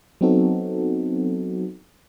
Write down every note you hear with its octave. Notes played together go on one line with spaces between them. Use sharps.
F#3 B3 C4 D#4 F#4 A4